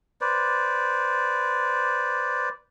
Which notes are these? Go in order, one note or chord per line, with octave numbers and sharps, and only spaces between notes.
B4 C5 D5